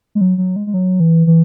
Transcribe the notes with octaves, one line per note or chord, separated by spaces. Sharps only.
G#3
F#3
F#3
G#3
G#3
F#3
E3
E3